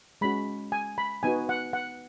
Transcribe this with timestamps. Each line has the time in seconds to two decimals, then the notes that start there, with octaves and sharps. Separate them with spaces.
0.21 G#3 C#4 F#4 B5
0.72 G#5
0.98 B5
1.23 B3 D#4 F#4 G#5
1.49 F#5
1.73 F#5